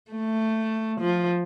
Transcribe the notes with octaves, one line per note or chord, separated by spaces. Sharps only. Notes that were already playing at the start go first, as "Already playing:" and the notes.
A3
F3